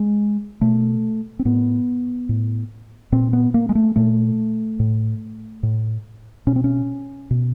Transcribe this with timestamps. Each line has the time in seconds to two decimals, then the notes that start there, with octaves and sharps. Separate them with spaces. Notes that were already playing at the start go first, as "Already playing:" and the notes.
Already playing: G#3
0.61 B2 A3
1.39 C4
1.45 A2 B3
2.29 A2
3.12 A#2 C4
3.33 B3
3.54 A#3
3.69 G#3
3.75 A3
3.96 A#2 A3
4.79 A2
5.63 A2
6.47 B2 C#4
6.56 C4
6.64 C#4
7.31 B2